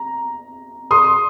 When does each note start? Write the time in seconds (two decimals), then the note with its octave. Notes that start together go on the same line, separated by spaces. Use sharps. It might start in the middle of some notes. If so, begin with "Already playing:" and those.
Already playing: A#5
0.91 C6 D#6